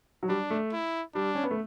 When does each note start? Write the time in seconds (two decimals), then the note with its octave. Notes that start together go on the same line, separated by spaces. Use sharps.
0.23 F#3
0.29 G3 D4
0.50 A3
0.73 E4
1.15 G3 D4
1.35 C#4
1.43 B3
1.51 A3